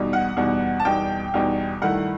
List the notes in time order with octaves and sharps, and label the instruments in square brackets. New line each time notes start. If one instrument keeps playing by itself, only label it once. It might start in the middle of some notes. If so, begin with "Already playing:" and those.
Already playing: [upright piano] E2 B2 G3 D#4
F#5
E2 B2 G3 D#4
A5
E2 B2 G3 D#4 G5
E2 B2 G3 D#4
G2 D#3 A3 E4 F#5